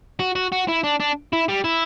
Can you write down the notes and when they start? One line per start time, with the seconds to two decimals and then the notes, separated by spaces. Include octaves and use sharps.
0.20 F#4
0.35 F#4
0.52 F#4
0.68 E4
0.83 D4
1.00 D4
1.33 E4
1.48 G3
1.64 E4